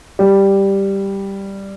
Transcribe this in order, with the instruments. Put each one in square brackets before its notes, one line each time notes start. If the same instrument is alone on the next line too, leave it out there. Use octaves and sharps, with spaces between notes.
[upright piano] G3